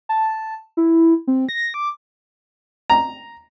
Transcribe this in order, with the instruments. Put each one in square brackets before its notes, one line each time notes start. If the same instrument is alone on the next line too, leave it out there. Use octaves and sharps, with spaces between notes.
[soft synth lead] A5
E4
C4
A#6
D6
[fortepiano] A#5